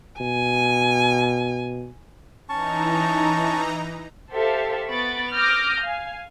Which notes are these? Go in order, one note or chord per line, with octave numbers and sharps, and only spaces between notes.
B2 G#5
E3 C#4 D#4 A5 A#5 C#6
G4 A4 C5 E5 F5
B3 B5 C#6 A6 D7
D6 D#6 F6 G6 A#6
F5 G#5